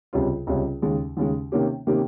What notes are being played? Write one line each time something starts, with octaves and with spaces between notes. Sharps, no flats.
C#2 C3 G3 C#4 F4
C#2 C3 G3 C#4 F4
D#2 C#3 G#3
D#2 C#3 G#3
C3 D#3 A#3 C#4 G4
C3 D#3 A#3 C#4 G4